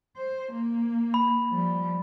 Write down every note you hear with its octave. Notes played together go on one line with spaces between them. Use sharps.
C5
A#3
B5
F3 G3